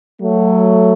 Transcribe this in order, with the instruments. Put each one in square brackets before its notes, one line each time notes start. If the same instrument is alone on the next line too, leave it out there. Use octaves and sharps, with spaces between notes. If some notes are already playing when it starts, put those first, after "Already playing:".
[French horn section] F#3 A3